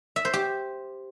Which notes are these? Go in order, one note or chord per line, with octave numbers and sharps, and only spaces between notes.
E5
C5
G4